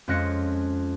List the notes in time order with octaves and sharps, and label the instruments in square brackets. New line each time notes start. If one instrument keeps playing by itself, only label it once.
[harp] F2 G#3 C#4 F#6 A#6 C#7